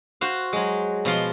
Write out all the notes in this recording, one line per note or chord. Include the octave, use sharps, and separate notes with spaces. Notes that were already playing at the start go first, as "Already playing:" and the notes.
F#4 C5 F5
F#3 G#3
B2 F3 F5 C6